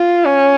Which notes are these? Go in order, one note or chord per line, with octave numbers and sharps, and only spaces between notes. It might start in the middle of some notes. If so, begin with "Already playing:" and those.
Already playing: F4
C#4